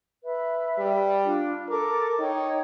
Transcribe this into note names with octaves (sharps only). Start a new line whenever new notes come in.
B4 E5
G3
D4 F4
A4 A#4 A5 D6
D#4 C#5 G5